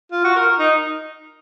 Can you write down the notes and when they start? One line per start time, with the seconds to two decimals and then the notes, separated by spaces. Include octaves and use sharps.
0.12 F4
0.24 F#4
0.35 A#4
0.59 D#4